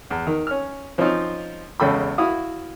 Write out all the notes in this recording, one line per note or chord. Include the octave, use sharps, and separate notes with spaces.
E2
D#3
C#4 F6
F3 C4 C#4 D#4 F4
G#1 E2 C#3 A4 G5 B5
E4 F#4 F5 D#6